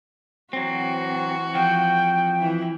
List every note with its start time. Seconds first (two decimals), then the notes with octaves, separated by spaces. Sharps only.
0.53 E3 F#3 C4 F#4
1.54 F2 F3 G5
2.39 E3 E4